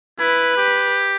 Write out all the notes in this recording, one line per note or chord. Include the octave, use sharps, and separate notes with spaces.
E4 B4
G4